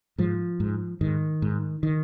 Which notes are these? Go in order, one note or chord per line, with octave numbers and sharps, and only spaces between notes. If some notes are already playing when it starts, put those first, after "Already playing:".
G#2 F3
G#2
G#2 D#3
G#2
D#3